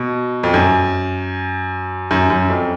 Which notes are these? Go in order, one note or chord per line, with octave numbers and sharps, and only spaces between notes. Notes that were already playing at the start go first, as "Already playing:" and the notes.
Already playing: B2
F2
F#2
F#2
F#2
F2